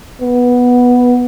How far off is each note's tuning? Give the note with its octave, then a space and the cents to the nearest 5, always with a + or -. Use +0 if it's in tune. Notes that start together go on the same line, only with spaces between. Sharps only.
B3 -5